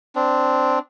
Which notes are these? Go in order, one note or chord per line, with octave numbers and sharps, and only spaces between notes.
C4 D4